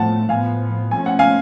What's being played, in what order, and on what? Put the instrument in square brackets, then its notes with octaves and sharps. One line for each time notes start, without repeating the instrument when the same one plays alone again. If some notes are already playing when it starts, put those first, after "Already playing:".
Already playing: [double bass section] A2 F3 A3 [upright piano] F#5 A5
[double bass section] A2 F3 B3 [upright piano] F5 G#5
[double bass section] F3 A3 C#4 [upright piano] G#5
[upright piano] F#5
F5 G#5